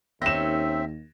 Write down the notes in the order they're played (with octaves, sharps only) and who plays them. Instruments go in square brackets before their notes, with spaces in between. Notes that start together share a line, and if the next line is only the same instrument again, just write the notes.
[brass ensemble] D#2 [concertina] C4 E5 [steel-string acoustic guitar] C#4 D#4 [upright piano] A#6 E7